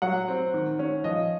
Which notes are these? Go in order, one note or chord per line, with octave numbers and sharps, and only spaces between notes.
F#3 F#5
C4
D#3
C#4
F3 D#5